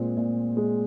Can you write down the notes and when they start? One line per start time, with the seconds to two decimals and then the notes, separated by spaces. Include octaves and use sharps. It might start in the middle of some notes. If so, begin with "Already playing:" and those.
Already playing: A#2 G#3 C4
0.17 A#2
0.57 G#3